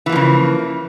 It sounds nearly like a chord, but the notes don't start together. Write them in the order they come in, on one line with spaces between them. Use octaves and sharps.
E3 A#3 F3 C#3